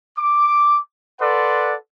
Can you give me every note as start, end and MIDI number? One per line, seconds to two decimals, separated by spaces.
0.17 0.79 86
1.20 1.75 69
1.20 1.75 71
1.20 1.75 74
1.20 1.75 78
1.20 1.75 84